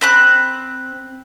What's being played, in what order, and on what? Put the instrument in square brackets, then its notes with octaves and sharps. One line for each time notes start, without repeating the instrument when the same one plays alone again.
[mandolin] C4 B5 F#6